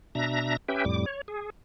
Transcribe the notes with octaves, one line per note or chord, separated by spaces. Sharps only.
B2 D4 E5 A#5 A#6
C#4 G4 B4 E5 G5
F2 A2 G3 D6
C#5
G#4